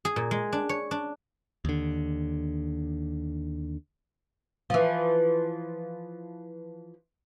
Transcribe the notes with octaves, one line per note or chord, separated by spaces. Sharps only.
G#4
A#2
G#3
D4
C#5
D4
D#2 D3
E3 F3